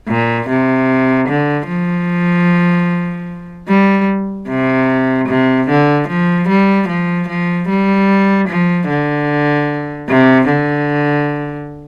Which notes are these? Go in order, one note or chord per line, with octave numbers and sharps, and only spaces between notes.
A#2
C3
D3
F3
G3
C3
C3
D3
F3
G3
F3
F3
G3
F3
D3
C3
D3